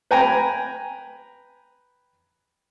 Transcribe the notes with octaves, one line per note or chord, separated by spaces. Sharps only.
B4 G5 G#5 A#5